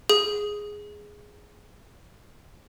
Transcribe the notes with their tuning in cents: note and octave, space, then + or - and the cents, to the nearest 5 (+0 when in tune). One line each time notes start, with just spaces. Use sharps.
G#4 +0